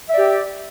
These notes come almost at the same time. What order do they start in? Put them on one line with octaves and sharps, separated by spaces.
E5 D5 G4